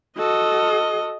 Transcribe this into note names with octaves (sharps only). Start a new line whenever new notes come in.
F#4 A4 D#5